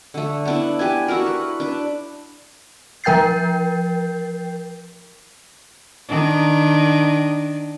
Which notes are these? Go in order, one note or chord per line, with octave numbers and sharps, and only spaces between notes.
D3 A3
B3 D4 E4
G4 B4 G#5
E4 F#4 A4 A#4
B4
D4 B4
F3 A#4 G5 G6 A6 C7
D#3 D4